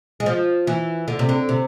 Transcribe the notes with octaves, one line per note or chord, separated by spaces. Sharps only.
G#3
F3
E3
D3
C3
D3
C3